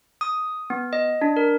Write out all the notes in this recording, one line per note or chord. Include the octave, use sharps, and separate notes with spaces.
D#6
B3
D#5
D4
A#4